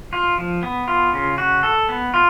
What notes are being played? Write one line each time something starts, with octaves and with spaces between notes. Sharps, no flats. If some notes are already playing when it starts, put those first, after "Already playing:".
F4
F3
B3
F4
C#3
F#4
A4
B3
F4